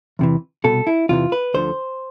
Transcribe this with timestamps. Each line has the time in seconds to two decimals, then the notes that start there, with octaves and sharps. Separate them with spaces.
0.19 E2 C3 E3
0.64 C2 B2 A4
0.87 E4
1.09 E2 C3 E3 F4
1.32 B4
1.54 D2 D3 F3 C5